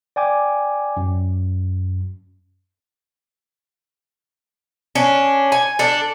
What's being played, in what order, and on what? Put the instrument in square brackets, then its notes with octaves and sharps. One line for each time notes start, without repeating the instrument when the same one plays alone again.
[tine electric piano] D5 G5 G#5 D6
F#2
[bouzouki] C#4 D4
G#5
D4 A4